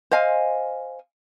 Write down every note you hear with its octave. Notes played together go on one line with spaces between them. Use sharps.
C5 D#5 F5 G#5